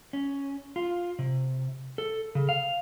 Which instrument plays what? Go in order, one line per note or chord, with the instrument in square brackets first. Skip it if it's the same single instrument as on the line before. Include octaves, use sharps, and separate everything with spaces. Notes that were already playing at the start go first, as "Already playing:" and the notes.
[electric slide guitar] C#4
F4
C3
A4
C#3
F5